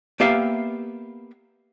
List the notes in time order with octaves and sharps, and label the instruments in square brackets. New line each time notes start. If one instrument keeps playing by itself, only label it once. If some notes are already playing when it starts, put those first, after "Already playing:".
[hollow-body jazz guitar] A#3 B3 G4 E5 F5